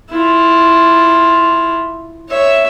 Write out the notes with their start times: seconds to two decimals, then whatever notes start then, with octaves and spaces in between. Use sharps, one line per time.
0.10 E4 F4
2.29 C#5 E5